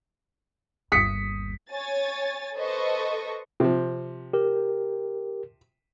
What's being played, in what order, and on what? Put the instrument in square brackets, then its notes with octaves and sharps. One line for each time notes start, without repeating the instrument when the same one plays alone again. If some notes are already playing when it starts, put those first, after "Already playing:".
[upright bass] G1 D#2 [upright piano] D#6 B6 C#7
[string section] C#5 G#5 A6
A4 B4 C5 D#5 C#6
[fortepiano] C3 F3
[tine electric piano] G4 A#4